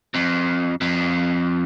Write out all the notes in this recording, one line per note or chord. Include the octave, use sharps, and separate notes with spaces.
F2
F2